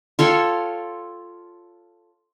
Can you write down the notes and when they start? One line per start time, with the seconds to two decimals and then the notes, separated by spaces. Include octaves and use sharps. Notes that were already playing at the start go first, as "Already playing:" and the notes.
0.19 F4 A4 C#5 G5